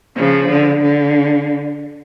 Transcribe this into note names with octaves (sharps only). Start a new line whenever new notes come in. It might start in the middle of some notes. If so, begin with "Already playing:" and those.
C#3 F3
D3
D3